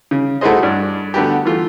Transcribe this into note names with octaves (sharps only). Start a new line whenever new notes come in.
C#3
A3 E4 F#4 G#4 C5 D#5
G2 D4
D3 A3 B3 F#4 G4
E3 A3 F4